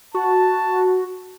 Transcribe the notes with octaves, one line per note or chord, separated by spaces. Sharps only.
F#4 A5